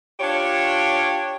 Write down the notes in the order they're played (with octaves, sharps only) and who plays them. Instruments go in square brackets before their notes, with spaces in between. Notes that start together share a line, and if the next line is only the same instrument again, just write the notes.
[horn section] D4 F4 G4 C#5